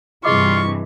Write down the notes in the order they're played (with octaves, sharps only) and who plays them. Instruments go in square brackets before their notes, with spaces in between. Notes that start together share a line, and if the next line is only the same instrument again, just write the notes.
[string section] G2 C3 E3 [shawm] F4 [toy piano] G#4 D#5 D6 [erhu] C#6